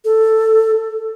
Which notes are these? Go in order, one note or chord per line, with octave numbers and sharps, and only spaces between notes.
A4